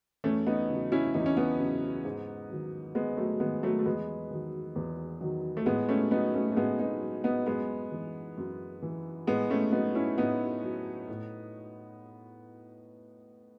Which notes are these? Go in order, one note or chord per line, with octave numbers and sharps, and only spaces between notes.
E2 A3 C#4
B3 D#4
C#3 F#3
C#4 E4
E2 D#4
C#4
B3 D#4
C#3 F#3
G#2
D#3 F#3
G#2 G#3 B3
F#3 A3
D#3 F#3 G#3 B3
F#3 A3
A3
E2 G#3 B3
D#3 F#3
E2
D#3 F#3
A3
A2 G#3 B3
A3 C#4
F#3 B3 D#4
A3 C#4
A3
A2 G#3 B3
B3 D#4
F#3
B3 D#4
F#2 G#3 B3
E3
F#2
E3
A2 G#3 B3
A3 C#4
F#3 B3 D#4
C#4 E4
A2 B3 D#4
F#3
A2